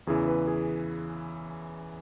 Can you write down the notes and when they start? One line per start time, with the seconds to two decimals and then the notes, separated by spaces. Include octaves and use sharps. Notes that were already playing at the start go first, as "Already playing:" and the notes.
0.07 E2 C#3 E3 G#4
0.28 B4
0.47 G#4